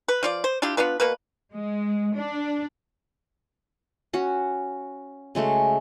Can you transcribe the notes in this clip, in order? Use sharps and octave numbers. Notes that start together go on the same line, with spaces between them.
B4
F3 F4 D5
C5
D4 E4 F4 G4
B3 D4 F4 B4
B2 A#3 B4
G#3
D4
C#4 F#4
C#3 G#3 A3 F#4